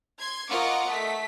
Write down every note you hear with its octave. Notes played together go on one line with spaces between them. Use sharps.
C6 G#6
F4 A#4 D#5 F#5 C#6 D6
A3 B6